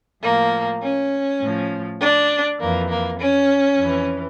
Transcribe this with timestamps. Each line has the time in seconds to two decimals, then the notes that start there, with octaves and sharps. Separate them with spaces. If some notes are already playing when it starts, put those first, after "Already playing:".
0.22 A2 F3 A#3
0.82 C#4
1.41 A2 F3
2.00 D4
2.60 F2 E3 A#3
2.89 A#3
3.19 C#4
3.78 F2 E3